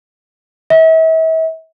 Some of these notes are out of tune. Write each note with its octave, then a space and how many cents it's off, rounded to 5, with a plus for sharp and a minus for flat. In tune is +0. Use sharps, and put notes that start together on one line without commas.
E5 -40